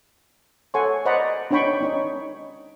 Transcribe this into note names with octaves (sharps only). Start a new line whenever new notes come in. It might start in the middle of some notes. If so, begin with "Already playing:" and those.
A4 C#5 F#5 G#5 C6 C#6
C5 D5 D#5 F#5 A#5 B5
D4 D#4 C#5 G5 B5 C#6
C#4 D#4 C#5